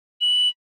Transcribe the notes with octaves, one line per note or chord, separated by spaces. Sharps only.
F#7